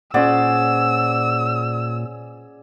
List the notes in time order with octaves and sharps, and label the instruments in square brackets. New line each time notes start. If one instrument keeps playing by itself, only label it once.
[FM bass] A#2 [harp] C#4 C5 F#5 [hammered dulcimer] G#4 D5 [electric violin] E6